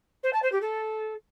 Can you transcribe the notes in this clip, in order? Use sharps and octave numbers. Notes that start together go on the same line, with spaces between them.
C5
A5
C5
G4
A4